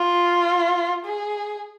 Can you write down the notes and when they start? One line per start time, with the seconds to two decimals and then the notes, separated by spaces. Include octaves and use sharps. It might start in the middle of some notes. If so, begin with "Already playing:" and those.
Already playing: F4
1.05 G#4